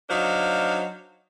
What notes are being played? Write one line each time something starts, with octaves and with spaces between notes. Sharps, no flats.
F#3 D4 D#4 C5 F5